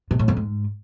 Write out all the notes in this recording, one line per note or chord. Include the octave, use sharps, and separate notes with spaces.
C3
A2
F2
G#2